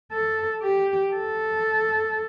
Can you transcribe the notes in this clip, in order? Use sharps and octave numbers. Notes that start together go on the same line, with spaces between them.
A4
G4
A4